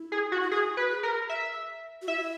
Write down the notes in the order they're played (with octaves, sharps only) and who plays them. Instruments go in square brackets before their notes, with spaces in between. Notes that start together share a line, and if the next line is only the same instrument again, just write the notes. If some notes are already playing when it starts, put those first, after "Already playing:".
Already playing: [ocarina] E4
[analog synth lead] G#4
F#4
[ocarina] E4
[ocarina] F#4 [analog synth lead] G#4
[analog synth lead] B4
[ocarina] G#4
[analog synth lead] A#4
E5
[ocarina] F#4
[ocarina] E4 [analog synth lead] E5